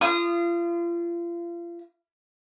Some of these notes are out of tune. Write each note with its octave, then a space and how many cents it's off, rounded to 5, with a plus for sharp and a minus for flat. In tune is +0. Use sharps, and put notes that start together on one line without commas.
F4 -35 D#6 -10